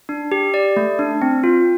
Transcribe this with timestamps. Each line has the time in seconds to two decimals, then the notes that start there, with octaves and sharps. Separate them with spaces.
0.09 D4
0.32 G4
0.54 D5
0.77 A3
0.99 D4
1.22 C4
1.44 F4